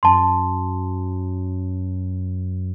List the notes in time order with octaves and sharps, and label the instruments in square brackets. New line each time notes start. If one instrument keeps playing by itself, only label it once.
[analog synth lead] F#2 [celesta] A5 C6